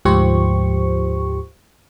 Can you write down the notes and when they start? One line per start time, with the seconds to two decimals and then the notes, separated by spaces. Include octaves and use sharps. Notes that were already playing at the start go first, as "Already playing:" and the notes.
0.05 D2 G#2 F3 G4 C5 C#6